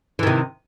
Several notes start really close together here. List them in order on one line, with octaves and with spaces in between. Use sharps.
E3 D#3 C3